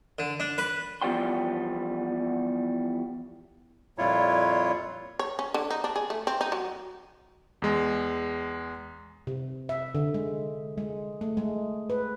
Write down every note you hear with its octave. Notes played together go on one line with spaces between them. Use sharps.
D3
D4
B4
E2 F3 G3 B3 G5 C6
F2 A#2 G3 E4 F4 C#5
C#5
C#4
D3
D#4
D4
G#4
A3
C4
D#4
F#3
E2 G#3
C3
E5
D3
G#3
G#3
A3
G#3
B4